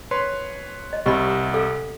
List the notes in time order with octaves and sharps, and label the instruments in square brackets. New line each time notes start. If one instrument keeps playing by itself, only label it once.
[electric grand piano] B4 C#5 C6
[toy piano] D#5
[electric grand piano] C2 C3 [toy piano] G4 D#5 B5
[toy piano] A4 F5